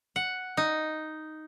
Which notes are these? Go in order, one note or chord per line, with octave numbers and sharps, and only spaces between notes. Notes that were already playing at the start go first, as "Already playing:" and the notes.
F#5
D#4